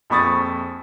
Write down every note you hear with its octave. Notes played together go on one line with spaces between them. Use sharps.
A#1 F2 B5 C#6 D#6 A6